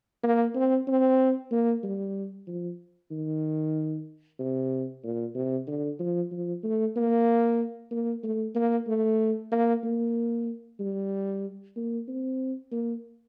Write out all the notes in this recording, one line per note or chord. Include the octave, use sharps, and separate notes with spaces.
A#3
C4
C4
A#3
G3
F3
D#3
C3
A#2
C3
D3
F3
F3
A3
A#3
A#3
A3
A#3
A3
A#3
A#3
G3
A#3
C4
A#3